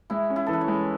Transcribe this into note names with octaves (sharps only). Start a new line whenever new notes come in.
G#3 E4
C#4
E4
E3 A4
B4
C#5
G#3